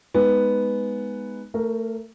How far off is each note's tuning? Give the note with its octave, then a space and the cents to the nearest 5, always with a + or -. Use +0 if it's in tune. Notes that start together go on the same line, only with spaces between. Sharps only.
G#3 +0 B3 +0 D#4 +0
A3 +25 A#4 +0